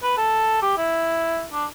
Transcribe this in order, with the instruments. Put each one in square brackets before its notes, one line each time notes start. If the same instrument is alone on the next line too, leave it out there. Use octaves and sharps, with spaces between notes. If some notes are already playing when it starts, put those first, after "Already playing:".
[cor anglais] B4
A4
G4
E4
D4